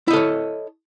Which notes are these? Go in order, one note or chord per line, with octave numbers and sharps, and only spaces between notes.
E4 A4 C#5 D#5